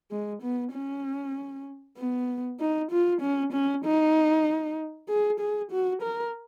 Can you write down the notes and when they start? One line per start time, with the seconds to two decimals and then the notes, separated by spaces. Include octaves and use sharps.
0.11 G#3
0.42 B3
0.73 C#4
1.98 B3
2.60 D#4
2.91 F4
3.22 C#4
3.53 C#4
3.84 D#4
5.09 G#4
5.40 G#4
5.71 F#4
6.02 A#4